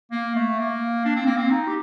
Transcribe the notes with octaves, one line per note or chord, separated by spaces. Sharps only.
A#3
A3
A#3
D4
C4
A#3
C4
D#4
G4